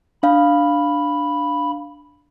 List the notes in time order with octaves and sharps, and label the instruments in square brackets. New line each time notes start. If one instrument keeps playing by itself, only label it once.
[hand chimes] D4 F5 [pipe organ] B5